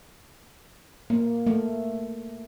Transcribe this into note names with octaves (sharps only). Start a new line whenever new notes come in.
A#3
A3